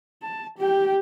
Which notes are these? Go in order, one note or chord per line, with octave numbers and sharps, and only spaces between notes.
A5
G4 G5